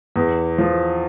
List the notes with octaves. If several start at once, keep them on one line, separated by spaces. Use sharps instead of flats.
E2
F3